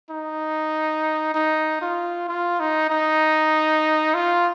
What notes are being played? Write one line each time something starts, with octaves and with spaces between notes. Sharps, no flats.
D#4
D#4
F4
F4
D#4
D#4
F4